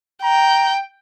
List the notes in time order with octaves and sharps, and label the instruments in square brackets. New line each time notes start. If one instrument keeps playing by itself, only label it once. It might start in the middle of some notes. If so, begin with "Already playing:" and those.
[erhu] G5 [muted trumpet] A#5